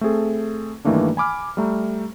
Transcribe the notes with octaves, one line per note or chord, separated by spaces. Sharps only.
A3 C4 G#4 A4
G2 D#3 E3 A3 A#3 D4
G#5 B5 D6 F6
G3 A3 A#5